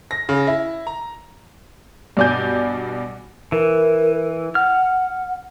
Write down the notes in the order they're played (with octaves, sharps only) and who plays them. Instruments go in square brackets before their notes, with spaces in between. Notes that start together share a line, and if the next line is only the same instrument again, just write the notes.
[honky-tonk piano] A#6
C#3
E4
A#5
G2 B2 D5 G#5 G6
[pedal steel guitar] E3 [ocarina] A#4
[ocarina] F#5 [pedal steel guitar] F6